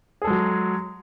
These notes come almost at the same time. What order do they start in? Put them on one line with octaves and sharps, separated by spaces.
G#4 A4 G#3 F#3